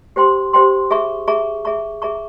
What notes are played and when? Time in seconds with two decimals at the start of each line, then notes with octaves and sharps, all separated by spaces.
0.16 G4 C5 G5 C6
0.53 G4 C5 G5 C6
0.91 G#4 E5 A#5 C#6
1.27 G#4 E5 A#5 C#6
1.65 G#4 E5 A#5 C#6
2.02 G#4 E5 A#5 C#6